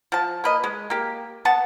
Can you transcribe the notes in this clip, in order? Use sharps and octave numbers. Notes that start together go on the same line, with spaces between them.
F3 A5
A#3 B4 D#5
G#3
A#3 G4
B3 F#5 A5